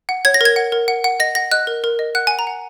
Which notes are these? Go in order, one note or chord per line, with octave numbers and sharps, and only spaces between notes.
F#5
C#5 G#6
A#6
A#4 G#6
F#5
A#4
F#5
F#5
D#5 A#6
F#5 A#6
D#5 F#6
A#4
A#4
D#5
F#5 F#6
F#5 G#5
A#5
F#5